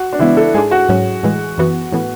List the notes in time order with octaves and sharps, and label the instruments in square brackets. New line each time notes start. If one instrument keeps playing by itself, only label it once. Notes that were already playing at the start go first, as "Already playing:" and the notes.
Already playing: [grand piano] F#4
D4
[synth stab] C#3 E3 G#3 B3 [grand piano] E4
[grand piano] A4
[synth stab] G#2 G#3 D4 [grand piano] G#4
[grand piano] F#4
[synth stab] G#2 F#3 C#4
A2 E3 G#3
F#2 E3 B3 F#4
A2 E3 B3